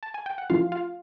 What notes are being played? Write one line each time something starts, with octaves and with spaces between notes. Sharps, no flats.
A5
G#5
G5
F#5
F3 A3 C#4 E4 F4 F5
F4 F5